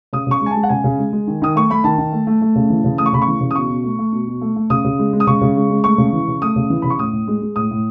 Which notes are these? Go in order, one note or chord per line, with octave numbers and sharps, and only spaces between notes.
C#3 D#6
C#3 C#6
G#3
G#5
A5
G#3
F#5
C#3 G#5
C#3
G#3
G#3
D#3
D#3 D#6
A3 C#6
A3 B5
D#3 A5
D#3
A3
A3
A3
C#3
E3
C#3
A3 D#6
C#6
C#3 B5
C#6
E3
C#3
D#6
B2 C#6
B2
A3
A3
B2
B2
A3
A3
C#3 D#6
C#3
G#3
G#3
D#6
C#3 C#6
C#3
G#3
G#3
A3 C#6
C#3
E3
C#3
A3 D#6
C#3
E3
C#3 B5
C#6
A2 D#6
A2
G#3
G#3
A2 D#6
A2